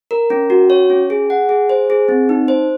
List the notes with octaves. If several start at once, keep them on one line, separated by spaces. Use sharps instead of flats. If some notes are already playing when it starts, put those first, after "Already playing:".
A#4
C#4
F#4
C#5
C#4
G#4
F#5
G#4
C5
G#4
C4
D#4
C5